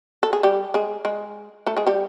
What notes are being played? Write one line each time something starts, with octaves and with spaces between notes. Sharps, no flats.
A4
G#4
G3 G4
G#3 G#4
G#3 G#4
A3 A4
G#3 G#4
G3 G4